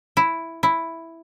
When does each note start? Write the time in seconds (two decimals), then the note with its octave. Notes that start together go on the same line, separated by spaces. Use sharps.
0.17 E4
0.63 E4